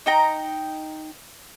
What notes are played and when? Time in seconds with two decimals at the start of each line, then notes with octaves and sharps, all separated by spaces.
0.06 D#4 G5 A#5